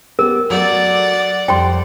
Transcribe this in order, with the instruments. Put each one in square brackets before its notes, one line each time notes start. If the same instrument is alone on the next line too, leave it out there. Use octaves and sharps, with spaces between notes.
[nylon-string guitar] B3 G4 [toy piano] A#4
[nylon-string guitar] F#3 A3 [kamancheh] D5 F#5
[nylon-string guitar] F2 G3 C5 [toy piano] G5 C6